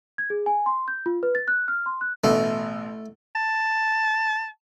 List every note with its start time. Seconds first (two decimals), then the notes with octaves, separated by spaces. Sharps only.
0.18 G#6
0.30 G#4
0.46 G#5
0.66 C6
0.88 G6
1.06 F4
1.23 B4
1.35 A6
1.48 F#6
1.68 F6
1.86 C6
2.01 F#6
2.24 A1 B2 A3
3.36 A5